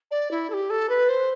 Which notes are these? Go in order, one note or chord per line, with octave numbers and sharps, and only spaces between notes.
D5
E4
A4
G4
A4
B4
C5